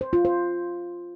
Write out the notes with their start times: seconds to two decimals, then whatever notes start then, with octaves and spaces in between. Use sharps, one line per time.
0.01 C5
0.13 F4
0.25 C5